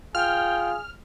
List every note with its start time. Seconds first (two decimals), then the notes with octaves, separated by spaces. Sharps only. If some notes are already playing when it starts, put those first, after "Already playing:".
0.15 F4 G#4 G5 F6